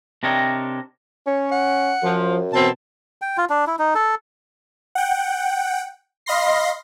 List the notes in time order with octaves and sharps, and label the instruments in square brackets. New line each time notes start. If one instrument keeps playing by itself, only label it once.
[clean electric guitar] C3 C4 D4 A#4 C#5 D#5
[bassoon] C#4 [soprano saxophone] C#5
[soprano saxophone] F#5
[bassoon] F#2 [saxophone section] F3
[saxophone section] B2 E3 C4 [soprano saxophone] A5
[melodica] G5
F4
D4
E4
D#4
A4
[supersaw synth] F#5 G5
D#5 F5 B5 C6 A#6 C7